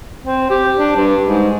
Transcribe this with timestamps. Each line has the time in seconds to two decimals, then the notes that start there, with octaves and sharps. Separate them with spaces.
0.23 C4
0.50 G4
0.76 D4
0.96 G2
1.24 G#2